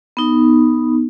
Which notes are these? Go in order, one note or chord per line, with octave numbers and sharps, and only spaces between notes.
B3 D#4